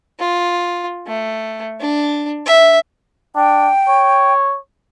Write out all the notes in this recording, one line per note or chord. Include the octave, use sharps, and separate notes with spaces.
F4
A3
D4
E5
D4 G5
C#5